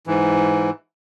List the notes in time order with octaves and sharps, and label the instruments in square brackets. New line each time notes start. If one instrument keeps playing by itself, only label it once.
[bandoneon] G#2 E3